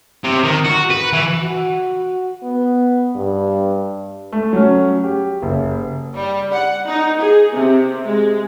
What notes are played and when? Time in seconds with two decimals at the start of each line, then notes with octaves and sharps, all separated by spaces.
0.24 C3
0.44 D#3
0.65 F#4
0.90 B4
1.13 E3
1.43 F#4
2.43 B3
3.16 G2
4.32 A3
4.53 F#3 C#4
5.04 G4
5.42 F#1
6.15 G3
6.53 F#5
6.88 D#4
7.21 G#4
7.53 C3
8.04 G#3